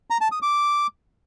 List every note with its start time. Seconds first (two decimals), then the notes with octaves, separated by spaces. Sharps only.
0.10 A#5
0.21 A5
0.32 D#6
0.42 D6